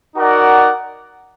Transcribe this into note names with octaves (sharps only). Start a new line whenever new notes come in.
D#4 F#4 A#4 D5 F#5